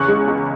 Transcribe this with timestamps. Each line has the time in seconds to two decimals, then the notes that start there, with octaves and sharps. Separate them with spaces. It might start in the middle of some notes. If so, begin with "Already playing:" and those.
Already playing: E2 C#3 C#6 F#6
0.08 G#3
0.28 C#2